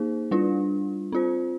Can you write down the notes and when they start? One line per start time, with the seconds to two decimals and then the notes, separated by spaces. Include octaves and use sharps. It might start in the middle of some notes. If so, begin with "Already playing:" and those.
Already playing: A#3 D#4 G#4 C5
0.31 G3 D4 F4
1.12 C4 F4 C5